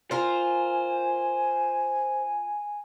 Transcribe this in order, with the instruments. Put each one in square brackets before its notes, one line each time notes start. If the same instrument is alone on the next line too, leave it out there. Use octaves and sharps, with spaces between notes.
[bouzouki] F4 A#4 [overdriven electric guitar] C5 [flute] G#5